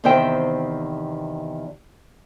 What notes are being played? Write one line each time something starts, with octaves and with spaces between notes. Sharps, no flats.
E2 C3 D#3 C5 E5 G5